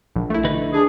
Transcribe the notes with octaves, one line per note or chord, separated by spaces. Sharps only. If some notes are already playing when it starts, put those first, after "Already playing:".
A#1
A3 E4
D3 D#4 B4
D4 G#4